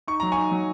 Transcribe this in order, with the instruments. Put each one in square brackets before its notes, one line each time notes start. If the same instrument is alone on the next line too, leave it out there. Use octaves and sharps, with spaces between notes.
[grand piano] D#4 C#6
F#3 A#5
G#5 C#6
D#4
F#3